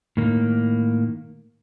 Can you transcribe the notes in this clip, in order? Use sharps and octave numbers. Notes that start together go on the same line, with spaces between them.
A2 D#3 A#3